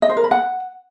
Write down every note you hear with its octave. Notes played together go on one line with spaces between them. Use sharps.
D#5
C5
A#4
B5
F#5